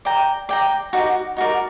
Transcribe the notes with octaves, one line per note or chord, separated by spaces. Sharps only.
D5 G5 A#5
D5 G5 A#5
D#4 F#4 A#4 D5
D#4 F#4 A#4 D5